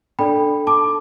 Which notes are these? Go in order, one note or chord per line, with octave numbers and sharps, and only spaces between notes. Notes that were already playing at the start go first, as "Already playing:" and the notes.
D4 A4 D5 G5 B5
A5 D6